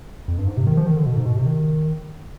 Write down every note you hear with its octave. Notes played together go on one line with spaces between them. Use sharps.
F2
G2
G#2
C3
D#3
F3
D#3
D3
B2
G#2
B2
C3
D#3